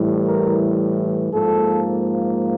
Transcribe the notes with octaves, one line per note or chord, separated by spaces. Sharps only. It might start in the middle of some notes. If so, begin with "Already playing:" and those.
Already playing: A2 E3 G3
A#4
G#2 F3 A#3 A4